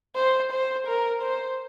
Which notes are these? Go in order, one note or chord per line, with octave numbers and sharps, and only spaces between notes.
C5
C5
A#4
C5